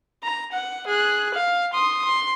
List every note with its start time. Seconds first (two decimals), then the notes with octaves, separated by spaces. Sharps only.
0.23 A#5
0.52 F#5
0.87 G#4 F#6
1.34 F5
1.73 C6 D#6
2.05 C6